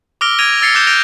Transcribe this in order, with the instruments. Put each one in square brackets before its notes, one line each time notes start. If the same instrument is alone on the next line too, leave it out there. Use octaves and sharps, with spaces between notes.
[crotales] D6 E6 F6 A#6 D7 G7
G#6 A#6 D7 D#7 F7
E6 A6 C7 C#7
D6 F#6 G6 A#6 E7
G6 A#6 D7 F7